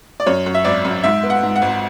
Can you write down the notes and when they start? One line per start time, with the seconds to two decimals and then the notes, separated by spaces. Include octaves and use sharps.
0.20 D5
0.26 F#2 C#5
0.46 F#2
0.54 E5
0.65 G#1 D5
0.85 F#2
1.03 G#2 E5
1.23 B3
1.30 F#5
1.43 G#2
1.56 F#5
1.62 G#1